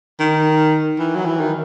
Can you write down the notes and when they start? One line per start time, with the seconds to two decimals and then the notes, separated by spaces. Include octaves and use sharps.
0.20 D#3
0.99 E3
1.15 F#3
1.26 E3
1.40 D#3